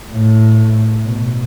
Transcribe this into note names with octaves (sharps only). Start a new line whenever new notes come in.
A2
B2